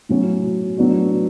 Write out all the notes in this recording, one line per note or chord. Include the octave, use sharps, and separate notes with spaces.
A2 F#3 C#4
A2 F#3 B3 D4 F#4